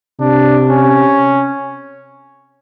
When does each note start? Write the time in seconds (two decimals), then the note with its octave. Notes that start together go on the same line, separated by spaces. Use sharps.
0.20 C3 D4
0.71 C#4